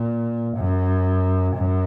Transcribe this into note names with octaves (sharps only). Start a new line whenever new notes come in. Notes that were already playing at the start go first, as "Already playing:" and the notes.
Already playing: A#2
F#2
F#2